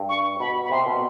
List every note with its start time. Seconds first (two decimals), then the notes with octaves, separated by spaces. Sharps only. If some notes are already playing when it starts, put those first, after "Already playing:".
Already playing: G2
0.09 C#6
0.40 B2 B5
0.65 B5
0.71 C3 C6
0.86 B2